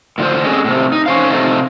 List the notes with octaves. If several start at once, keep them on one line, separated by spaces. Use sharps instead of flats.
A2 D3 F4 C5
C4 C#4 G#4 A4 C#5 D#5
A2 C3
D#4
C#4 C5 F5
A2 C3 A3 D#4 F4